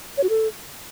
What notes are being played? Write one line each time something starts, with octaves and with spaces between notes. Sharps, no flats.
C#5
F#4
A4